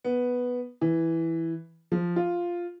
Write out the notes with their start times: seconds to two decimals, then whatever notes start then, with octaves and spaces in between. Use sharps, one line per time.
0.04 B3
0.81 E3
1.92 F3
2.16 F4